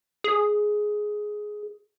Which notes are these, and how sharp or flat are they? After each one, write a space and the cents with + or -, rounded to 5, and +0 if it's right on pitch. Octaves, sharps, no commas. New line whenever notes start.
G#4 +10